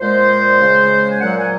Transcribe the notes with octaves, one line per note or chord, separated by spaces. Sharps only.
A#2 G#3 C5
C#3 G#3
G#5
A#2 F#3 A#3 F#5
G#5